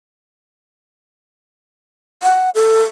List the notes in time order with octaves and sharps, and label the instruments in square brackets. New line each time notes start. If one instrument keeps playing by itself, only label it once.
[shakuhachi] F#5
A4